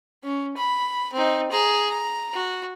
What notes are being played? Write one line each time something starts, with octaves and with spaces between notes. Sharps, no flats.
C#4
B5
C4 D#4
G#4 A#5
A#5
F#4